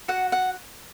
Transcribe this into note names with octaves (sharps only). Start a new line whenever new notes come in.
F#4 F#5
F#5